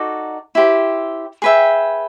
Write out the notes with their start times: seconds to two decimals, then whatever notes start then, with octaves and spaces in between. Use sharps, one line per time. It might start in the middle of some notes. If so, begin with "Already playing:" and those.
Already playing: D#4 F#4 A4 D5
0.55 E4 G4 C5
1.42 G#4 B4 E5 G5